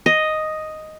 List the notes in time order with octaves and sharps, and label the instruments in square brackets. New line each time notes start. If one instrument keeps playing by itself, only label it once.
[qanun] D#5